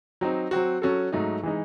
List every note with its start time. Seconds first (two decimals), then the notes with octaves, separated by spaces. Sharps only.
0.21 F#3 C4 D#4
0.51 F#3 C4 F#4
0.82 F#3 C#4 F#4 A4
1.12 G#2 F#3 A3 D#4
1.43 E3 G#3 D#4